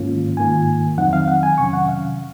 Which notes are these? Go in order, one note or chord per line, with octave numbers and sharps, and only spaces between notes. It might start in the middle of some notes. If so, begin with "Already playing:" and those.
Already playing: G#2 D#3 A#3 C#4 F4
G#2 D#3 A#3 F4 G#5
F2 D#3 F#3 C4 D#4 F#5
F5
F#5
G#5
F2 C3 D#3 F#3 C#4 C#6
F#5
F5